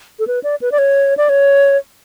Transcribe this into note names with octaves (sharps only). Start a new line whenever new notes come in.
A4
B4
D5
B4
D5
C#5
D5
C#5